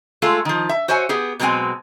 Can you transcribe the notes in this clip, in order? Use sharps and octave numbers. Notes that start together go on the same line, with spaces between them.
G#3 A3 F4 A4
D#3 F3
E5
F#4 C5 C#5 E5 G#5
B3 G4 G#4
B2 F#3 G#3 C4 G5 G#5